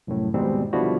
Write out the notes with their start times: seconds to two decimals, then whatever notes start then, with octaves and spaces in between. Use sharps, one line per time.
0.07 C2 F#2 A2
0.34 D#2 G#2 B2 G3 C4
0.73 B2 D3 F3 G3 E4 F#4